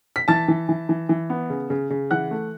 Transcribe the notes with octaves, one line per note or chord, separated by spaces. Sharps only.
B6
E3 A5 A6
E3
E3
E3
E3
B3
C#3
C#3
C#3
E3 F#5 F#6
A3